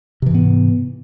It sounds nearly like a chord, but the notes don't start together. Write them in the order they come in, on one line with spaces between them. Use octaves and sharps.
C3 E3 G#2 B3